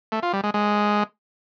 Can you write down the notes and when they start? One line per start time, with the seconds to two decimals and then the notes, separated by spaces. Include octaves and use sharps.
0.12 A3
0.23 F4
0.33 G3
0.44 G#3
0.54 G#3